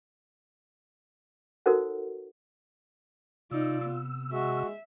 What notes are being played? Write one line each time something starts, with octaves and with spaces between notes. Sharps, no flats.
D#4 F#4 A4 A#4 C5 F#5
C3 D#4 F4 D5 E6
B3
G#3 F#4 E5